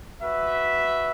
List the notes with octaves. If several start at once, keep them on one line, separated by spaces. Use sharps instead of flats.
F#4 B4 E5